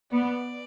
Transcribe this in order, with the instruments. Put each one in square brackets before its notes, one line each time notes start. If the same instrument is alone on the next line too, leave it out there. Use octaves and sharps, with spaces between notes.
[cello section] B3 [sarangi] D5